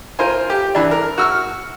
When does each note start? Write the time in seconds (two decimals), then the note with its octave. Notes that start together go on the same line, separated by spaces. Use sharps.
0.19 F4 A#4 C5 G#5
0.50 G4
0.75 E3 D4
0.91 A#4
1.18 F#4 E6 F6